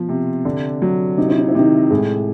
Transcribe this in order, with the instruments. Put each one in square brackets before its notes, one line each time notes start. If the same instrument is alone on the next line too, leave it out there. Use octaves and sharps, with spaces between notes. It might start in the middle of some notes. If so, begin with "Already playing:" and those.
Already playing: [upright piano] B2 F3
C3
D3
F#3
[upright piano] C3 [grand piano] D#4
[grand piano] E4
D#4
E4
[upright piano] C3 [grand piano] D#3 D#4
[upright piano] A2 [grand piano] G#3 G#4